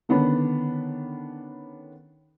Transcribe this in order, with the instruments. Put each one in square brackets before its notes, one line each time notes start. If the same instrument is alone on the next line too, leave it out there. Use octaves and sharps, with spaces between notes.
[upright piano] D3 D#3 B3 C#4 D4 B5